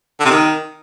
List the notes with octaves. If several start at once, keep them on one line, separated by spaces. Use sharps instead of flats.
D3
C3
D#3